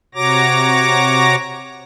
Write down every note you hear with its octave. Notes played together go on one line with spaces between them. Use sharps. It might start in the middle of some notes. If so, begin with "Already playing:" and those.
C3 F#4 C#5 A#5 D6 A#6